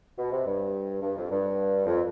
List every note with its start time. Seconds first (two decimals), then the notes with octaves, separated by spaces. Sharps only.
0.17 B2
0.32 C3
0.46 G2
1.02 G2
1.16 F2
1.30 G2
1.86 F2